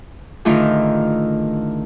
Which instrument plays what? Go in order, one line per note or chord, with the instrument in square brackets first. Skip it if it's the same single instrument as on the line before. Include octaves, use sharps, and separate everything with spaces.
[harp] A2 D3 D#3 A3 F4 G#4